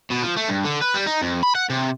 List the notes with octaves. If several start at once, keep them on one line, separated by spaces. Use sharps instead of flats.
B2
F3
A3
G2
D3
B4
G3
D#4
F2
B5
F#5
C3